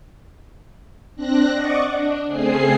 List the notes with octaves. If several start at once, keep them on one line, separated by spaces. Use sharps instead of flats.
C4 D4 F#6 A#6
D5 D#5 F#5 C#6 D6
D4
C#3 A3 C4 G#4 G#5 C7